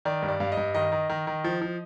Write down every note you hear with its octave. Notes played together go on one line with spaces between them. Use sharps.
D#3 D5
G2
D5
G2 F5
D#5
G2
D#3 D#5
D#3
D#3
D#3
F3
F3